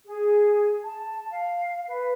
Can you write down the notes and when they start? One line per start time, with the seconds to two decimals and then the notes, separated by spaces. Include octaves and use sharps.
0.05 G#4
0.83 A5
1.32 F5
1.89 B4